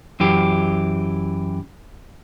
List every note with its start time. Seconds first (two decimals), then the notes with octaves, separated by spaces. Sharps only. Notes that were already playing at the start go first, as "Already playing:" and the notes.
0.20 F#2 E3 G4